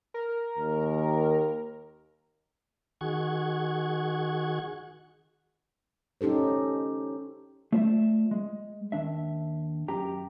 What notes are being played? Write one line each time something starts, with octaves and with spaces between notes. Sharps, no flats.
A#4
D#2
D#3 F#4 G#4 F#5 C#6 G#6
C#4 D#4 G4 A4 C5
A3 F4 C5 D5 E5
G#3
D#2 D4 E5
F#2 G4 G5 A#5